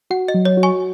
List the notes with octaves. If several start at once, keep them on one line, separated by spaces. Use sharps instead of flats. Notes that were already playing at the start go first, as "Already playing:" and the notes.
F#4 F#5
D#5
F#3
C#5
F#4
G#5 C#6